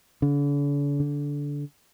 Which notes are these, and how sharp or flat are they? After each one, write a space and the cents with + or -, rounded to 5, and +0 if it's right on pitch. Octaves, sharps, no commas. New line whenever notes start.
D3 -45
D3 -20